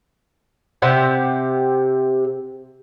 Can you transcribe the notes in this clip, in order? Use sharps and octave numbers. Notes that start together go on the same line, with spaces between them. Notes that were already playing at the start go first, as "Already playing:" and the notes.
C3 G4 F#5